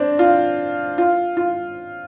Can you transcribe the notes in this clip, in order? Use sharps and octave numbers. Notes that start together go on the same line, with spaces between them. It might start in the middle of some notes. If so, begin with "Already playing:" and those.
Already playing: C4 D4
F4
F4
F4